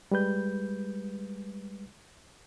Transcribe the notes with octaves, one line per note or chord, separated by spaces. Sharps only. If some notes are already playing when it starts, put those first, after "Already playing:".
G3 G#3 B4 G6